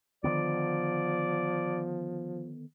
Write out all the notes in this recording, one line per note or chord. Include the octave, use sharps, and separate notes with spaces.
D3 D#3 F3 B3 D5